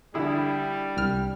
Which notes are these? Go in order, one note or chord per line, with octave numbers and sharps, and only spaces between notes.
D3 G3 E4 G#4
C2 F6